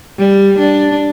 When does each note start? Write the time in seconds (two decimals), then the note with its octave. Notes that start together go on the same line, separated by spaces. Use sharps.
0.18 G3
0.59 D4